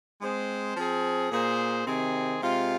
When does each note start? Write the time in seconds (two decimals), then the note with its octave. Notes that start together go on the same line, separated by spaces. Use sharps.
0.22 G#3 C4 G#4 C5
0.77 F3 C4 G#4
1.32 A#2 A#3 G#4 C5
1.87 C3 D#3 C4 G#4
2.41 C3 G#3 F4